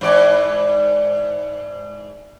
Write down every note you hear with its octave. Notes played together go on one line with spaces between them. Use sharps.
G#2 E3 D5